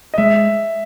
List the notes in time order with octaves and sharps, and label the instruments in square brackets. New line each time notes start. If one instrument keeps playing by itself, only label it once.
[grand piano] D#5
[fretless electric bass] G#3 [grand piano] E5